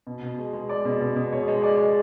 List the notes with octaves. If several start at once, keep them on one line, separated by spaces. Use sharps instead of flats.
B2
B2
G#3
G#3
G#3 D5
B2
B2
B2
G#3 C#5
G#3
G#3 D5
G#3